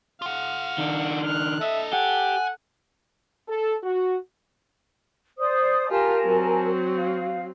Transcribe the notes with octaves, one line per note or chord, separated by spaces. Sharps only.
F4 F5 F#5
D#3 D4
F6 F#6
D4 A4 D#5 E5
G4 F#5 G#5
A4
F#4
C5 D5 D#6
F4 G4 A#4 G#5 A5
F#3 C4
F5